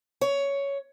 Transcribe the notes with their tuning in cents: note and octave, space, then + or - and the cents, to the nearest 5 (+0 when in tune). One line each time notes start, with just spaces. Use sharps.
C#5 +10